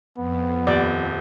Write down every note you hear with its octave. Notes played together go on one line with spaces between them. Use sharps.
F2 B3
D#1 D5